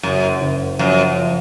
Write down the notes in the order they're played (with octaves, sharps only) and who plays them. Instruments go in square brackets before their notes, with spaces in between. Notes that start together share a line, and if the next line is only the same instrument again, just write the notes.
[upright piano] F#1 [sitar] F#2
[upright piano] F#1
[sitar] F#2 [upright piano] F3
[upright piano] F3